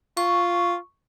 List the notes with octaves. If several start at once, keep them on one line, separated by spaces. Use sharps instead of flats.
F4 C#6